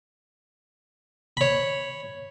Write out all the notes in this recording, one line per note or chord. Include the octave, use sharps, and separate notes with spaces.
C#5 B5